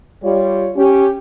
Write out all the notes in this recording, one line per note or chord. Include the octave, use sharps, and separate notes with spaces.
G3 F4 C#5
C#4 G4